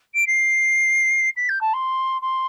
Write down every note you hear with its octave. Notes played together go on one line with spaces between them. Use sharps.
D7
C7
B6
G6
A5
C6
C6